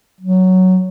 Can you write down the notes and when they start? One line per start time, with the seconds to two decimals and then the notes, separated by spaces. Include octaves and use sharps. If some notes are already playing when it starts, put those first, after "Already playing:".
0.20 F#3